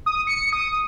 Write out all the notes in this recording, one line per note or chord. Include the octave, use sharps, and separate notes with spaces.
D#6
C#7
D#6